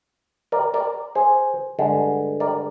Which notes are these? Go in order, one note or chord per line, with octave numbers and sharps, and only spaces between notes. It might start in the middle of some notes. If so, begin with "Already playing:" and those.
A#4 D5
A#4 D5
G#4 C5
G2 D3 G#3
A#4 D5